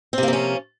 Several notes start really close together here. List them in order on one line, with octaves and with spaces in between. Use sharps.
C4 C3 A#3 F3 C#4